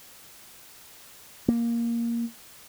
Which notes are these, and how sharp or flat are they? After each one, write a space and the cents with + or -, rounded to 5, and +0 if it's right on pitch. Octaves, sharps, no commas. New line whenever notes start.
A#3 +5